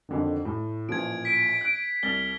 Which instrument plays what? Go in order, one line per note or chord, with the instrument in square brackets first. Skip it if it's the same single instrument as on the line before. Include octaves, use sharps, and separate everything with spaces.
[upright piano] F2 D3 D#3
A2
[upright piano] A1 A#2 F3 [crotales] G#6 D7
[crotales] B6 [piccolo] D7
[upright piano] F#6
[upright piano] C2 A6 [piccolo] F6 [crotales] G7